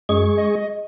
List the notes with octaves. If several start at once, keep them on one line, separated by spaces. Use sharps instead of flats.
F#2 G#3 G#4 C#6
D#5